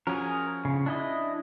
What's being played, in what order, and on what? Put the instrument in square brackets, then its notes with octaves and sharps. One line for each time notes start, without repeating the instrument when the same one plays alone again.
[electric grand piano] F3 C#4 F#4 [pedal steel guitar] G#4 A#4
[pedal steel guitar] C#3
D4 E4 D#5